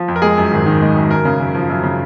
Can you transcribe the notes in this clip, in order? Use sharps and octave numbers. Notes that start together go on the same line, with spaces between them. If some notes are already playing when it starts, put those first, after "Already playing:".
Already playing: F3
F2
A#4
G#3 G#4
F#2
G#1
D#3
G#3
F#2
F#2 A#4
C#3
F#2
F3
F#2
C#3